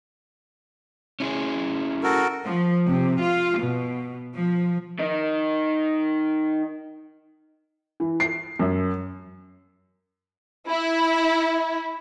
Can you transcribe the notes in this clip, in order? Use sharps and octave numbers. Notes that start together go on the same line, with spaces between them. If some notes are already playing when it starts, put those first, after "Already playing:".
C#4 E4 G#4
F#4 A4 A#4
F3
C3
F4
B2
F3
D#3 D#4
E3
C7
F#2
E4